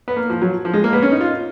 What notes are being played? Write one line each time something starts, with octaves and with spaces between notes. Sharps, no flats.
B3
A#3
F3
F#3
F3
G#3
A#3
B3
C#4
D#4
F4